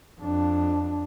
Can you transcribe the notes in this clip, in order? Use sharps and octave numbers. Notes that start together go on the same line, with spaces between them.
F2 D4